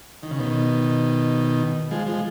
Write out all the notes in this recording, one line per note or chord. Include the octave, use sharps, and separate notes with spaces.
D#3
C#3
B2 D#3
F3 G#3
F3 G#3